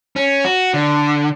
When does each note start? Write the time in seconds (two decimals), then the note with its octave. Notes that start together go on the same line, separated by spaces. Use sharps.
0.16 C#4
0.45 F#4
0.74 D3